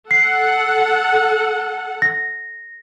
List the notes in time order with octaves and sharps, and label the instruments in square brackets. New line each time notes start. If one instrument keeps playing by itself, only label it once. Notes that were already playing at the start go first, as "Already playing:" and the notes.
[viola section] A4 F#5 [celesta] C7
[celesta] A#6